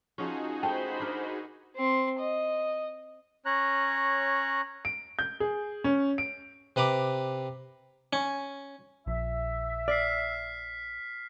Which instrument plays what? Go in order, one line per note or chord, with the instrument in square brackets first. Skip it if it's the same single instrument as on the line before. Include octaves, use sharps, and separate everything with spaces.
[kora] F3 C#4 [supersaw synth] D#4 F#4 G#4
[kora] A3 [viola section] C5 B5 [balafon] G5 A5
[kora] D4 A#4
[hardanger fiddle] C4 C6
D#5
[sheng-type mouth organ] C#4 C#5 A#5 F#6
[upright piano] D7
G6
G#4
C#4
D7
[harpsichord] C3 B4 A#5 B5 D6
C#4
[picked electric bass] A#1 F3 [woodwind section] E5
[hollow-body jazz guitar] D5 [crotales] F6 B6 C7